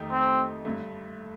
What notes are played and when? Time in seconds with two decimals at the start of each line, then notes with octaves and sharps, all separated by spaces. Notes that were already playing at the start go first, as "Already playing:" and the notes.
Already playing: F2 D#3 A3 D#4 G4
0.11 C4
0.65 G2 D3 A3